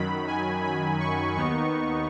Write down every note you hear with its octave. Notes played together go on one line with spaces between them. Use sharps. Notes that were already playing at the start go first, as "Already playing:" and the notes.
Already playing: F#2 D#3 F#3 B5
G#5
B5
C#6
D#2 D#3 B3 D#4 C#6